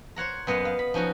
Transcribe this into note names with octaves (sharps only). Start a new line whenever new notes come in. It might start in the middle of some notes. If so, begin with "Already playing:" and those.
C5 C#5 F#5 A#5
F#2 B3 D#5 F5 F#5
F5
B5
F3 C#4 D#4 F#4